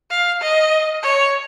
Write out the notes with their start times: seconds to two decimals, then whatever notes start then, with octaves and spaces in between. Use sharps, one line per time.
0.11 F5
0.42 D#5
1.03 C#5